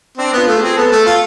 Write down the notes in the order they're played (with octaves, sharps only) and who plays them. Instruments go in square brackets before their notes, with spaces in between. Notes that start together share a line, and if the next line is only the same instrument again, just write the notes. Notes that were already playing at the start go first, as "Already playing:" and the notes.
[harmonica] C4 [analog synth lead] D4
[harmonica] B3 [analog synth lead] F4
[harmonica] A3
[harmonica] C4 [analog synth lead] G#4
[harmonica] B3 [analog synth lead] A4
[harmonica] A3
F4